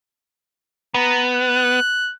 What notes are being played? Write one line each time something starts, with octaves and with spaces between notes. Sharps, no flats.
B3 A#5
F#6